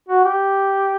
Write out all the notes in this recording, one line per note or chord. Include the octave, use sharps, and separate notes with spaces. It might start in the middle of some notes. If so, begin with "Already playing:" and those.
F#4
G4